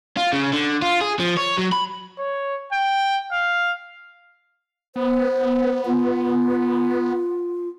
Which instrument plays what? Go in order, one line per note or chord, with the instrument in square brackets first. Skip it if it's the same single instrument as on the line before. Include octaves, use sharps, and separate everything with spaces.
[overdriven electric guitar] F4
C#3
D3
F4
G#4
F3
C#5
F#3
B5
[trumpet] C#5
G5
F5
[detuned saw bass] B3 [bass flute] C5
[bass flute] F4